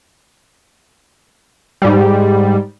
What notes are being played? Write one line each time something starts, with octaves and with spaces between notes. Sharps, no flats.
G#2 G3